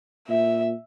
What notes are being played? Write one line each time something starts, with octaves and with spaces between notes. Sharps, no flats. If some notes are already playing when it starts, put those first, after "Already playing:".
A#2 E5